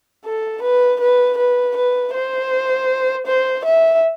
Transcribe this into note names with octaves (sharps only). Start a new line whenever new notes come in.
A4
B4
B4
B4
B4
C5
C5
E5